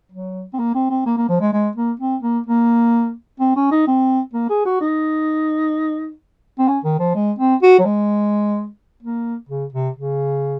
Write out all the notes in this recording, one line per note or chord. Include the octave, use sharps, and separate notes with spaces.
F#3
C4
A#3
C4
C4
A#3
A#3
F3
G#3
G#3
A#3
C4
A#3
A#3
C4
C#4
D#4
C4
A#3
G#4
F#4
D#4
C4
C#4
D#3
F3
G#3
C4
F#4
F#3
G#3
A#3
C#3
C3
C#3